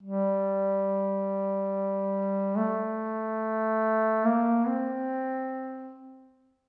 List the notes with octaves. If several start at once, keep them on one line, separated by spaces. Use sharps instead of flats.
G3
A3
A#3
C4